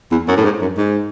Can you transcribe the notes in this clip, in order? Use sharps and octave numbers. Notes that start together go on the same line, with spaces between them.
E2
F#2
A2
G#2
F#2
G#2